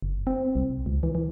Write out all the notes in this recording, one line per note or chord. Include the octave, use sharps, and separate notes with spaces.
F#1
C4
C2
C#2
E3
E3